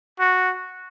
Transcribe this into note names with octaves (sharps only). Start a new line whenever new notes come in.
F#4